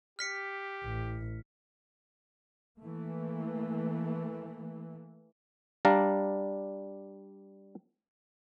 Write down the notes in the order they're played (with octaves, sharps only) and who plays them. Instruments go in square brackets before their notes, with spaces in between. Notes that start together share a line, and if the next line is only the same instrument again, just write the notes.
[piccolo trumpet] G4 [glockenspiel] F6 B6 C#7
[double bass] A1
[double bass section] E3 A3 A#3
[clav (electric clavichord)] G3 D4 D5 F5 A#5